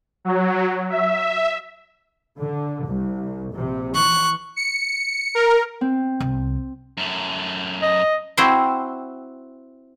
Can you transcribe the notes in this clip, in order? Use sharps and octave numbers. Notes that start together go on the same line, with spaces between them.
F#3
E5
D3
C2
A#1 C3
E3 C#6 F#6
C#7
A#4
C4
C2
F#2 A3
D#5
C4 E4 F#4 C5 G5